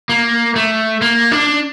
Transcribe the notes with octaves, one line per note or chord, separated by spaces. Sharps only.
A#3
A3
A#3
D4